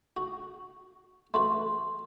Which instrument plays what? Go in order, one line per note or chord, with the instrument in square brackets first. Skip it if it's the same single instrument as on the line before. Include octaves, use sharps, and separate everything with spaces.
[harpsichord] F#4
[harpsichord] A3 F#4 B4 [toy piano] C6